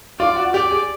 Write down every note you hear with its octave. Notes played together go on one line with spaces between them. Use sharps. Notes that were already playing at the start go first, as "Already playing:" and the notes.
F4 D5
F#4
G4 D5
G#4